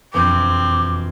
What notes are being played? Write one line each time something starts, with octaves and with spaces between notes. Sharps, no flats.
E1 F2 C4 D6 G6